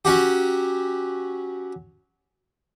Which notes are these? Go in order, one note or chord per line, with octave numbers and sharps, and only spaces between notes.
F#3 C#4 F#4 G4